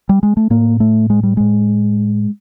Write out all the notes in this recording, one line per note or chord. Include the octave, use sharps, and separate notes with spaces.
G3
G#3
A3
A2 A#3
A3
G#3
G3
A2 G#3